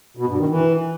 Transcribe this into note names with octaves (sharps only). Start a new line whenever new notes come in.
B2
G2
D#3
E3